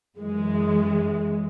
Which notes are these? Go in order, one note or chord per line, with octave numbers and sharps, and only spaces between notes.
F#2 E3 G#3